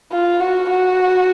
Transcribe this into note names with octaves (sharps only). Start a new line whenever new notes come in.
F4
F#4
F#4